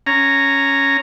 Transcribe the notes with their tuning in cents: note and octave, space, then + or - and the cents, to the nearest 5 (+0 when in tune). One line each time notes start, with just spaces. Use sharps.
C#4 +0 A#5 -5